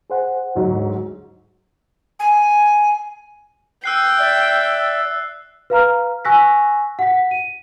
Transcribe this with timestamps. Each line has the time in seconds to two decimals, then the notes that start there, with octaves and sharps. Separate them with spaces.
0.10 G#4 C5 F#5
0.55 D2 G#2 F#3
2.19 G#5
3.84 G5 E6 F#6 C7
4.19 D5 E5
5.70 B4 F5 A#5 F6
6.25 G#5 C#6 E6 F#6 A#6 B6
6.99 F#5 B6
7.31 D#7